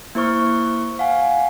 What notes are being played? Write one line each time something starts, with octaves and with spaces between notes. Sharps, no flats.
A#3 E4 C5 C#6 F6
F5 F#5 G#5